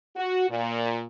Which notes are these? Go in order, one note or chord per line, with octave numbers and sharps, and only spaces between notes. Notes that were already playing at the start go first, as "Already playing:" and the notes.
F#4
A#2